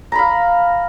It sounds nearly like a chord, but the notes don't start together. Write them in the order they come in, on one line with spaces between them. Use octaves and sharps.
A#5 B5 F5